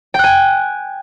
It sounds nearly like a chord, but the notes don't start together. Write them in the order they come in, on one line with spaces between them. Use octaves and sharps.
G5 F#6 G#5